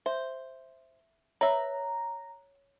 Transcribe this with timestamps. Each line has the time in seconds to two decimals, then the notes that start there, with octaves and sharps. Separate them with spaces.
0.06 C5 E5
1.41 B4 C#5 E5 A#5